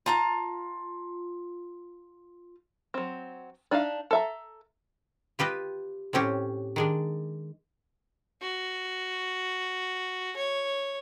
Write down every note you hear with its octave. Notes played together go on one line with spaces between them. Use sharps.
F4 A5 A#5
F#3 C4
D4 D#4 E5 F5
A4 E5 A#5
F4 G4 B4 D#5
A2 C4 C#4 G4
D#3 G#3 D4
F#4
C#5